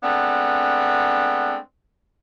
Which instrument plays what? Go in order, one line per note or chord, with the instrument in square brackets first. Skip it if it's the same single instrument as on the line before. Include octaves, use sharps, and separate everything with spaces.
[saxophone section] G#3 A3 B3 C4 D4